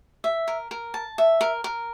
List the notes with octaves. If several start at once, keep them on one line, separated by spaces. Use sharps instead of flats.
E5
A#4
A#4
A5
E5
A#4
A#4